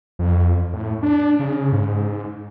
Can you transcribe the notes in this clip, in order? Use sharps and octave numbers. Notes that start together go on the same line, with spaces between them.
F2
A2
D4
C#3
G#2